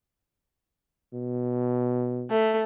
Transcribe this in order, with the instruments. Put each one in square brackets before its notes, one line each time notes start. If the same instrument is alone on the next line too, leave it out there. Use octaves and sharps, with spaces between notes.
[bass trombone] B2
[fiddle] A3